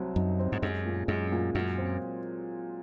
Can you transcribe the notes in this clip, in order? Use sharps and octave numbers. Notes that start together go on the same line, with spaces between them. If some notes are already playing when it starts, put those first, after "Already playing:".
Already playing: C2 F#3 C4
F#2 D#4
C4
G#2
F#2 G#3
A#2
F#2 G#3
A#2
F#2 F#3
C4